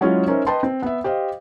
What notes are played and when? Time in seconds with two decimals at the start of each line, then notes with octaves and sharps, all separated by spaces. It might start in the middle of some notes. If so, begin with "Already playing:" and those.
0.01 F#3 G#3 C#4 E4 F4 G#4
0.28 C#4 D#4 A#4 C5 E5
0.47 B4 D#5 G5 A5 C6
0.63 C4
0.82 B3 E5
1.04 G4 C5 D#5 F5